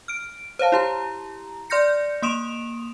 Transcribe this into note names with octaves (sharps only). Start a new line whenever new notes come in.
F6 D7
C5 C#5 F5 A5
E4 G4 A#5
D5 C6 F6 G6 A#6 C#7
A#3 C6 D#6 D7 E7 F7